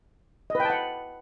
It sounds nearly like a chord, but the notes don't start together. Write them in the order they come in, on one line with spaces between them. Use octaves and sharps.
D#5 B4 G5 A5 F#5